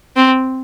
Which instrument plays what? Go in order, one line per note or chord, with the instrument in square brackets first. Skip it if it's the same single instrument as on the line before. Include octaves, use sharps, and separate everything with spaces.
[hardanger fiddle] C4